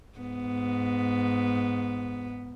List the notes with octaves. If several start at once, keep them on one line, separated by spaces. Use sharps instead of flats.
G#2 B3